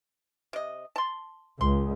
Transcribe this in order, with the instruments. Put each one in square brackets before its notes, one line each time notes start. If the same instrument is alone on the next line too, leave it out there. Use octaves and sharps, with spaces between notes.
[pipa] C3 D#5
A5 C6
[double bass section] C#2 [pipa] C6